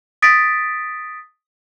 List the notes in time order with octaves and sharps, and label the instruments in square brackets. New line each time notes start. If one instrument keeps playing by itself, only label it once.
[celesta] D#6 A6 B6 D7